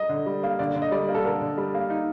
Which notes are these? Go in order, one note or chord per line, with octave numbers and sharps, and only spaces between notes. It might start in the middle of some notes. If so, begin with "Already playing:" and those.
Already playing: D#5
D3
G3
A#3
D3 D5
D3
D#5
G3 D5
A#3
A4
D3 A#4
D3
G3
A#3
D#4